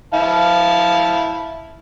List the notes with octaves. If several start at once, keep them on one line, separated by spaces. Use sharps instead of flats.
E4 F5 A5